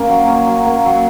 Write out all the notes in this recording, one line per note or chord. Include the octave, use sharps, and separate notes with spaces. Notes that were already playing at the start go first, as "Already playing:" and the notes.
Already playing: A#3 C#4
F#3
C#4
F#3
A#3
F#3